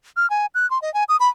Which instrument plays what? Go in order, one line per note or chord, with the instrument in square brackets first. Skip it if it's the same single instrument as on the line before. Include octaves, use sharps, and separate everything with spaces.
[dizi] F6
G#5
F#6
C6
D#5
G#5
D#6
B5